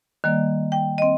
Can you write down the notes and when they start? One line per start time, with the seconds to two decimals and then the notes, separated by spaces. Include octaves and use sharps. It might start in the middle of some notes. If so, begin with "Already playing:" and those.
0.24 D#3 G3 A#3 D5
0.72 G5
0.98 C4 D#5